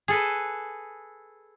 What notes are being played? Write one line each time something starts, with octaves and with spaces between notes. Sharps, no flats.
G#4 A4 B4